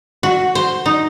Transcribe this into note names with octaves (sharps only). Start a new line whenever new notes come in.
F#4
C5
D#4